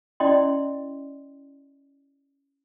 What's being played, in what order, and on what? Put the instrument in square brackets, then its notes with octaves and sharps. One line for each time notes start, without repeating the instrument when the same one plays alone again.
[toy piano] C#4 E4 D5 D#5 G5 C6